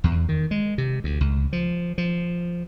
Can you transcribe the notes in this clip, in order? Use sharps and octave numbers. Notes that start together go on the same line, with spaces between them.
E2
D#3
G#3
C3
D2
C#2
F3
F3